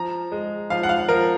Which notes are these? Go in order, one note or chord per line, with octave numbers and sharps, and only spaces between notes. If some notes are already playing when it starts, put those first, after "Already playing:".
Already playing: F3 A#5
G#3
F3 F5
F#5
F5
F3 A#4